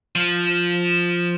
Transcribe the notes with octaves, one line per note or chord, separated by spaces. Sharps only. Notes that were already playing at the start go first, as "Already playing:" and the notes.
F3